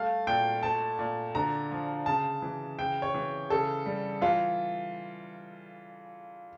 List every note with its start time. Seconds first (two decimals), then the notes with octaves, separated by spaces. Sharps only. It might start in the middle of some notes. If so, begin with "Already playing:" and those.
Already playing: G3 A3 F5
0.27 A#2 G5
0.63 A3 A5
0.99 A#2
1.35 D3 A#5
1.71 F3
2.06 C#3 A5
2.42 E3
2.79 C#3 G5
3.02 C#5
3.14 E3
3.50 C#3 A4
3.86 G3
4.21 E3 F4